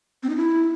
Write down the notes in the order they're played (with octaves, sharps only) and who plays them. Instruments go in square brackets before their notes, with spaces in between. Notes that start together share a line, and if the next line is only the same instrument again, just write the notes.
[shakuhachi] C4
D#4
E4